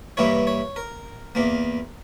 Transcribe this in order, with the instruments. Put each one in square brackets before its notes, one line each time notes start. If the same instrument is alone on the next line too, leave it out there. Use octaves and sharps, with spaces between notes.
[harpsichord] G2 E3 A#3 E4 C#5
C#5
A#4
E2 E3 A#3